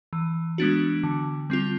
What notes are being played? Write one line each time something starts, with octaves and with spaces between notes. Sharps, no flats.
E3
G#3 B3 D4 F#4
D3
G3 C4 F4